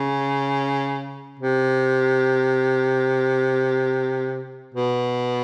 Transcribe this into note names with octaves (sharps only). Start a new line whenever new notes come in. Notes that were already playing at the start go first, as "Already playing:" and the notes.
Already playing: C#3
C3
B2